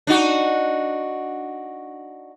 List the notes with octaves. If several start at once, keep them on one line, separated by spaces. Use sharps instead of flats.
D4 D#4 F#4